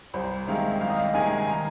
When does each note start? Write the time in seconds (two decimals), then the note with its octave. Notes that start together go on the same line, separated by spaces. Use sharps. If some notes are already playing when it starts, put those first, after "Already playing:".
0.14 C2 C5
0.47 C3 D#3 G#3 F5
0.81 C2 F5
0.89 D#5
0.96 F5
1.14 C3 D#3 G#3 G#5
1.39 G#5
1.48 A#5